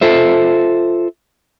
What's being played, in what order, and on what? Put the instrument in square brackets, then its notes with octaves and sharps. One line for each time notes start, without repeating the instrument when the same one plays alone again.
[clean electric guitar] F4 A4 C5 E5